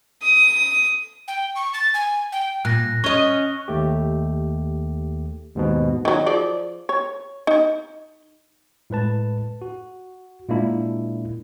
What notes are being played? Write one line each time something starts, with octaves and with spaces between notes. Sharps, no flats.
D#6
G5
C#6
A6
G#5
G5
A#2 F#6 A#6
C#4 D#5 C#6
D#2 A3 G4
D#2 G#2 B2
D#3 F#3
F3 G#4 D5
C#5
D#4
A2 G#3 B4 A5
F#4
A#2 G#3 A#3 D4 E4